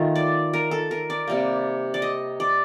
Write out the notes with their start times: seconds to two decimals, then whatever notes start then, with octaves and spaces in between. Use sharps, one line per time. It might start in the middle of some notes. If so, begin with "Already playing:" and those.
Already playing: D#3 A3 F4
0.15 D5
0.53 A#4
0.71 A4
0.91 A#4
1.10 D5
1.28 C3 G3 A#3
1.94 D5
2.02 D#5
2.40 D5